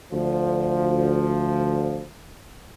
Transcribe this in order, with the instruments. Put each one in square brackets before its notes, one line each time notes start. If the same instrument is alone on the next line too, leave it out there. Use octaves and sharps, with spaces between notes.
[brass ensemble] D2 F3